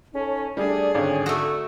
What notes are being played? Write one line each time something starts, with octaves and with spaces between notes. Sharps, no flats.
C#4 D#4 A4 C#5
G3 A3 D4 G#4 D5
G#1 D3 G3 C#4
A3 D4 F#4